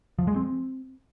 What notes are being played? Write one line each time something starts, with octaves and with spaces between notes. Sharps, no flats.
F3
G#3
C4